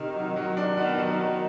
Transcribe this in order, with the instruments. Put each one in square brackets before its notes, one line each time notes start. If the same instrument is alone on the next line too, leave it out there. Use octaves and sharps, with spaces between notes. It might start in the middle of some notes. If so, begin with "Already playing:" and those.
Already playing: [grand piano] C3 [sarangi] D#3
[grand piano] F#3
F#3
D4
[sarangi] D#3 [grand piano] B3
[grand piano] F#3
[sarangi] D#3
[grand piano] F#3